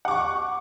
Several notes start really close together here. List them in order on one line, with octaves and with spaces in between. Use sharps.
F#5 D6 C#6